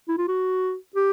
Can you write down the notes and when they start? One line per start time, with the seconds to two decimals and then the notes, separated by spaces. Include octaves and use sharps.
0.08 E4
0.18 F4
0.28 F#4
0.96 G4